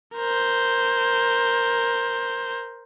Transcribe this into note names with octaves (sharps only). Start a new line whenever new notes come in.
A#4 C5